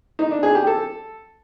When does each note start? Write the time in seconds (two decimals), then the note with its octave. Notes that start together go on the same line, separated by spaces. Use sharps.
0.19 D#4
0.31 D4
0.43 G#4
0.55 G4
0.67 A4